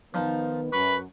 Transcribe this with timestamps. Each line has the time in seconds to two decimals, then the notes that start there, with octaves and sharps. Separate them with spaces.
0.14 D#3 F3 B3 D#4 B4
0.72 F#2 B4 C#6